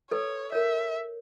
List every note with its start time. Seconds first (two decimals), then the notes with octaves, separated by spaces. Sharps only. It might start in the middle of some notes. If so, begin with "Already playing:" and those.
0.11 A4 B4 C#5
0.52 A#4 C#5 E5